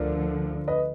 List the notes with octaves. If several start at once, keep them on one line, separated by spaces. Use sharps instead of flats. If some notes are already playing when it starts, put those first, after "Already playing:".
Already playing: D2 D3 F3 A#4 D5
B4 D#5